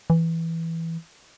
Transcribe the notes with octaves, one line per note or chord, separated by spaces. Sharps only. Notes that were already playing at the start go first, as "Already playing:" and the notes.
E3